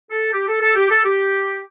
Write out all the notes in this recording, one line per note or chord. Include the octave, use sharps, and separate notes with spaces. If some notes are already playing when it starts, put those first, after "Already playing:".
A4
G4
A4
A4
G4
A4
G4